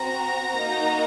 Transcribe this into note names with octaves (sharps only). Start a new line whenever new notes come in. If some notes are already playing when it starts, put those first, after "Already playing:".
Already playing: C4 F#4 A#5
A#3 D#4 F#4